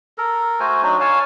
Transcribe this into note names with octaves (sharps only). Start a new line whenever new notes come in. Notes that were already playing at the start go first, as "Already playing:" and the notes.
A4 A#4
A3 F#4 C5 G#5
F#3 D4 D#4 F#4
C#5 F5 G#5 A5